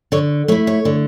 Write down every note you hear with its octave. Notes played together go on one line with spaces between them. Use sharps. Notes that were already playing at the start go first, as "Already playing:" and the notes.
D3 C#5
A3 E4 C#5
C#5
D3